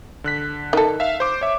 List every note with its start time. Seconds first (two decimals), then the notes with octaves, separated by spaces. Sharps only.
0.24 D3 F#6 B6
0.73 D#3 A4
1.00 E5 F5
1.20 C5 D6
1.41 C#5 E5